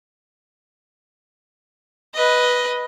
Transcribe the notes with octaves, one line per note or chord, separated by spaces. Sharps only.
B4 D#5